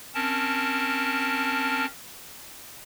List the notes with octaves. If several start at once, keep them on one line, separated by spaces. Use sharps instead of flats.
C4 C#4 A#4 A5